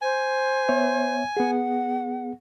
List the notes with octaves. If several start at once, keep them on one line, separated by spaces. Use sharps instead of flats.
C5 G#5
B3 C#5 E5
B3 G#4 F#5